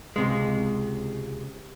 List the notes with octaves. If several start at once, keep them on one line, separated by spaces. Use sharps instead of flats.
C#2 C3 G#3